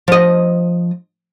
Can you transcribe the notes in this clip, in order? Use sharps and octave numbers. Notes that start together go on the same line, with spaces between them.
F3 D#5